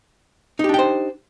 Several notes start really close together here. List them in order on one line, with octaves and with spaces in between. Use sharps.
D#4 G4 D4 G5 C5